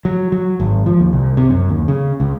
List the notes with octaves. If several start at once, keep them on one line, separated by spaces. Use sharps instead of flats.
F#3
F#3
G#1
F3
D#2
C2
C3
F#2
D#2
C#3
C#2